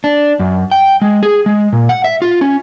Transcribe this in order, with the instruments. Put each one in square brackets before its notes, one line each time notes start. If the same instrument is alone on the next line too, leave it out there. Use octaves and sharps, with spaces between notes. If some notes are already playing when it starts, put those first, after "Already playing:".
[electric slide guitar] D4
F#2
G5
G#3
G#4
G#3
A#2
F#5
E5
F4
C#4